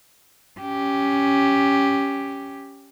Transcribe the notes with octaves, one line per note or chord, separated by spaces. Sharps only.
C#4 G4